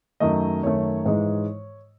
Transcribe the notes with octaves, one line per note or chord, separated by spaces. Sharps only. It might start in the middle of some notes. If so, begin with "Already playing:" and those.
F#2 D#3 A3 D#5
F#2 D#3 A3 C#5
G#2 E3 G#3